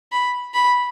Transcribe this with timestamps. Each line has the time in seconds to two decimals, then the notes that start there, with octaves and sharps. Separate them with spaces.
0.12 B5
0.54 B5